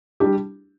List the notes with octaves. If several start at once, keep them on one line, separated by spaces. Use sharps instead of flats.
G3 D4 G4